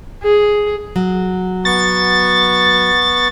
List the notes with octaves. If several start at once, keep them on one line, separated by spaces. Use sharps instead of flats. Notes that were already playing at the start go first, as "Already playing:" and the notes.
G#4
F#3
B3 C#6 A6